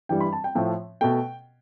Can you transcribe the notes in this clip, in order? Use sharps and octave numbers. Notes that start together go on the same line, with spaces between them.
G2 E3 G3 G5
B5
A5
G5
A2 F3 A3 G5
B2 A3 G5